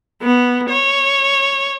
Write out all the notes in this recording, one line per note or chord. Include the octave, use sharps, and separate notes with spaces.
B3
C#5